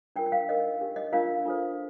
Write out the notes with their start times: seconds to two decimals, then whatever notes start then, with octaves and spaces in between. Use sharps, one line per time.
0.16 D4 F4 A#4 G5
0.26 G5
0.32 F5
0.49 D#4 A#4 D#5
0.80 D4 G4 A#4
0.96 D#5
1.12 D4 F4 A#4 F5
1.45 D4 F4 A4 C5